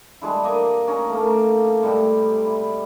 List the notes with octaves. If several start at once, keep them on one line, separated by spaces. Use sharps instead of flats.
G3 G#3 D4 E4
A#3 D5 D#5 G#5
C#4 D#4
A3 A#3
A2 C3 G3 G#3
E4